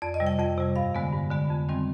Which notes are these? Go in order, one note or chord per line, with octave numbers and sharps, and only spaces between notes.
F2 D5
D#5
C3 G3
G5
F2 G5
C3 G3
G2 F5
D3 G#3 B3
G2
D3 G#3 B3
F2
D#3 G3 C4